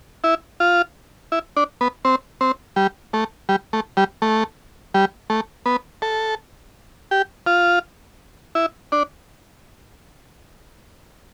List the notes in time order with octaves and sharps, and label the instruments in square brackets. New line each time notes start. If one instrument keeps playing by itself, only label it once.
[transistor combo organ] E4
F4
E4
D4
B3
C4
C4
G3
A3
G3
A3
G3
A3
G3
A3
B3
A4
G4
F4
E4
D4